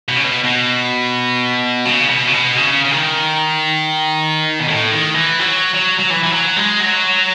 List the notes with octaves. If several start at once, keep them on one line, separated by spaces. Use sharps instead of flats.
B2
C#3
B2
B2
C#3
B2
C#3
B2
C#3
C#3
D#3
B2
A2
D#3
E3
F#3
F#3
F#3
E3
E3
F#3
G#3
F#3